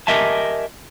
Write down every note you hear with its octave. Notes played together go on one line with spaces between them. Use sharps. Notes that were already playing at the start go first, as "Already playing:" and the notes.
G4 A#4 D#5 E5 G#5 A5